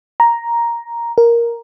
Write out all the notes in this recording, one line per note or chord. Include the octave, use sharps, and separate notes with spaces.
A#5
A#4